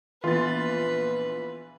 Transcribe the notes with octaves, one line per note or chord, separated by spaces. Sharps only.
A#1 E3 B3 F4 B4 A6